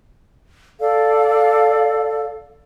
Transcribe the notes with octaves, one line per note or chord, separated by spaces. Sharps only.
A4 D5 F5